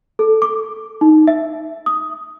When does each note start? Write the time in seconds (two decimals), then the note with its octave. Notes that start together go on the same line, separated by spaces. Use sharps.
0.19 A4
0.42 D6
1.01 D#4
1.27 E5
1.86 D#6